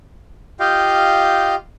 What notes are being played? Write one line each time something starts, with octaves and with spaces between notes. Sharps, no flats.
F4 G4 D#5 F5 G5